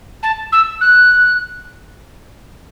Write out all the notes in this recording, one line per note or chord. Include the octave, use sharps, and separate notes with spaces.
A5
E6
F#6